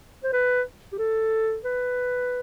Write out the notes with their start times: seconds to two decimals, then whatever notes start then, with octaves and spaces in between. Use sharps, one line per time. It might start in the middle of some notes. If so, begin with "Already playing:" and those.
0.23 C5
0.33 B4
0.93 G4
0.99 A4
1.64 B4